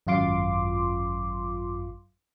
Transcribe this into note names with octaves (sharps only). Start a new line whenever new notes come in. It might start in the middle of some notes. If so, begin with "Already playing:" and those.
G#1 F#2 F4 C6 D6